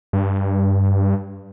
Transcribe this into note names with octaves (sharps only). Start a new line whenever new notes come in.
G2